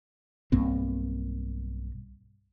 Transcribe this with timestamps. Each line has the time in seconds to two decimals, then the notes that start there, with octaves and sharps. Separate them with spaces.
0.52 B1 G2 A#3 C4